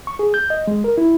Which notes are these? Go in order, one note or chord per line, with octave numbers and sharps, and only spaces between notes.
C#6
G#4
G6
D#5
G#3
A#4
E4